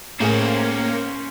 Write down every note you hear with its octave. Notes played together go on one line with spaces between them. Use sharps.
A2 A#3 C#4 G#4 C5 G#5